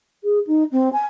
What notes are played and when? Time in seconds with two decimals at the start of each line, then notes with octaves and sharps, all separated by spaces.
0.24 G#4
0.47 D#4
0.72 C4
0.93 G#5